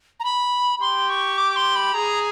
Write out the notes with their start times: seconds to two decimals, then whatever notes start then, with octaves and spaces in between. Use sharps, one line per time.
0.20 A#5
0.24 B5
0.81 G4 C6
1.10 C#6
1.38 D6
1.56 C6
1.76 B5
1.94 G#4 A#5